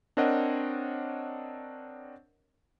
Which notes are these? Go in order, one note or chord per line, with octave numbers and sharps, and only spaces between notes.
C4 D4 A#4 C#5 D#5 F#5